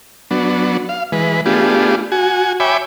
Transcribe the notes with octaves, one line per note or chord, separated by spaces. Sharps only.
F#3 B3 D4
F5
E3 G#3 B4
A3 B3 D4 F4 G4 G#4
F#4 G#5
C#5 E5 G5 G#5 B5 D6